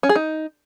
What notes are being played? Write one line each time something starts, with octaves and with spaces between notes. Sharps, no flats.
C#4
G#4
D#4